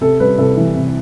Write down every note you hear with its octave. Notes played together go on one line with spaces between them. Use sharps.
C3 A4
G3 B4
C2 A4
E3
C3